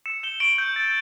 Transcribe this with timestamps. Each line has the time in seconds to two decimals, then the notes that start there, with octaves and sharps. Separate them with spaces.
0.06 E6 C#7 E7
0.23 G6 E7 G7
0.40 C#6 D7 F#7
0.58 E6 G6
0.76 E6 A6